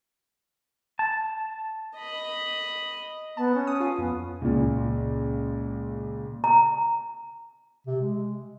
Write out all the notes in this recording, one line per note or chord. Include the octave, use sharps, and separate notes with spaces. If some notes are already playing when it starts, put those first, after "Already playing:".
A5
D#5 B5
B3 A5
C#4
D#6
F4
F2 B3
C#2 A#2
A#5
C3
G#3